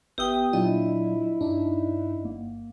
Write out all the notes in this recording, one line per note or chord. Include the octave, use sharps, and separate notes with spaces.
G1 B3 G4 E5 G5 D#6
A#2 F#3 D4 E4 F4 D#5
G2 D4 D#4
G1 A#3